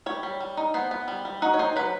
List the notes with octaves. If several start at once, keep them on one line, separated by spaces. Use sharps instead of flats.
G3 C#5
G3
G3
D#4
B3 C5
B3
G3
G3
D#4 F#4
C#5
D#4 C5
F#3 B4